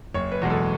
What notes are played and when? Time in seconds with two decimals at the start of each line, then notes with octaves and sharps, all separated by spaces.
0.14 F#1 C#5
0.32 B4
0.42 E2 B2 G#3
0.50 A4